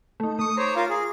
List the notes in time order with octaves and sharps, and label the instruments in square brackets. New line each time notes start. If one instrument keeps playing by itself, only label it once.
[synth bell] A3 D#4
[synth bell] A3 C#6 [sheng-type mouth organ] D#6
[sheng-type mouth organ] C5 C#5 [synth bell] A#5 D6
[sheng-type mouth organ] F4 A#4 F5
G#4